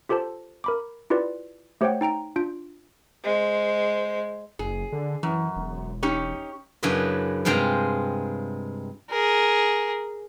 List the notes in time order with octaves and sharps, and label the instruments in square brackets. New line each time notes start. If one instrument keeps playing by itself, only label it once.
[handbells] F4 G4 A4 C5 A5
A#4 B5 D6
E4 F4 G4 B4 D5
A3 G4 C5 C#5 F#5 G5
D#4 G5 A#5 D7
D4 F4 G6 D7
[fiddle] G#3 C5
[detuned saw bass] F#1 [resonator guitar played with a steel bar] G#4
[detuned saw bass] D3
[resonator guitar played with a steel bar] F#2 [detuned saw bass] E3
[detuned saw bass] E1
[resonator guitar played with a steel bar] C#4 D#4 G4
[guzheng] F#2 C#3 D4 E4 B4 D#5
G2 C3 G#3 F4 G5 A#5
[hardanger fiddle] G#4 A#4